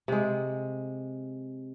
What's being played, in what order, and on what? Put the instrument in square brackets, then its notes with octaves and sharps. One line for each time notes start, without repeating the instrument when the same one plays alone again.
[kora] C3 G#3